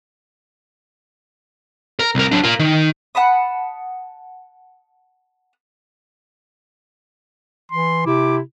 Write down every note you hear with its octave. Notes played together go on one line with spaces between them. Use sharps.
A#4 A#5
C2 A#4
F#3 D4
F4 A#4
D#3
F#5 A5 B5 D#6
E3 C6
C3 E4 D6